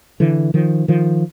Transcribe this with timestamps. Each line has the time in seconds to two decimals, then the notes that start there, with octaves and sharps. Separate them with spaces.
0.20 D3 E3
0.54 D#3 F3
0.88 D#3 F3